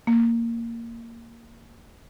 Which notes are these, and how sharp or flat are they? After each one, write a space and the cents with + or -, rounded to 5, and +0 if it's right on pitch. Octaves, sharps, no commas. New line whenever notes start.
A#3 -10